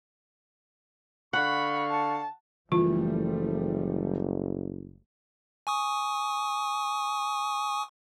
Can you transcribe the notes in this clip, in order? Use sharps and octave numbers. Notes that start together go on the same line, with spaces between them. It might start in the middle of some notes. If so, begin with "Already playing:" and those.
D3 F5 F#5 B5 C#6
A5
F#1 E3 F3 G3 A3 F4
G#5 C#6 D#6